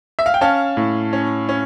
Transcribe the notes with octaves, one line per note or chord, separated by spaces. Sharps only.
E5
F5
G5
C#4 F5 A5
A2
C#4
C#4